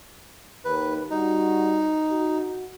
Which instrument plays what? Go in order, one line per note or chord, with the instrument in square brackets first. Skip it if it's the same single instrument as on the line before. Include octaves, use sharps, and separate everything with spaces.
[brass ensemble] D#2 [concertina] B4
[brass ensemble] G3 F#4 [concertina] D#4
[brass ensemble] F#4